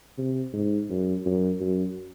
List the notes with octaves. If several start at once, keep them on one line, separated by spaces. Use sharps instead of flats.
C3
G#2
F#2
F#2
F#2